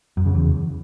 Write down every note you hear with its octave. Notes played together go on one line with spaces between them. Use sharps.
F#2
C#3
E2